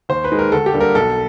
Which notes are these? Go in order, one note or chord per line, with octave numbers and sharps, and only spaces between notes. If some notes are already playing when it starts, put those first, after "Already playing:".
D#2 C5
B4
D#3 G#3
A#4
D2 A4
G4
D3 G3 A#3
A#4
B1 A4